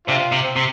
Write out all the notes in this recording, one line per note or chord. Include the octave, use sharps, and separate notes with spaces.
C3 C4 D4 F4
C3
C4
C3